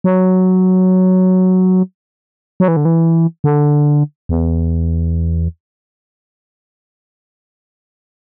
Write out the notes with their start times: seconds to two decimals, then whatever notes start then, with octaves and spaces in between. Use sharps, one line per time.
0.04 F#3
2.60 F#3
2.68 E3
2.77 D3
2.85 E3
3.44 D3
4.29 E2